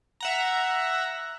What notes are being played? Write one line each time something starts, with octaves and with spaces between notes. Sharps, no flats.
E5 F#5 A#5